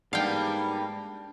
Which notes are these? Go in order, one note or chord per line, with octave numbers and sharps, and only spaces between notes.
G#2 G3 A#3 B3 D4 F5 G5